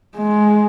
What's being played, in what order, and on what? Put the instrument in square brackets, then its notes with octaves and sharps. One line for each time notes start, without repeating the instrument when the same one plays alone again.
[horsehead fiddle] G#3